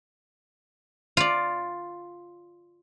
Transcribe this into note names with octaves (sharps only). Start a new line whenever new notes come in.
F4 D5